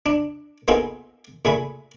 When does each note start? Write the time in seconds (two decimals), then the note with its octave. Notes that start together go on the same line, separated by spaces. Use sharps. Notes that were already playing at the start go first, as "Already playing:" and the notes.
0.06 D4
0.68 A#3 B3 D#4 F4 G#4 A4
1.45 A#2 A3 G#4 B5